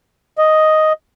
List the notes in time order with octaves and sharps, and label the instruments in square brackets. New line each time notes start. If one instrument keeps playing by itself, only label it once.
[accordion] D#5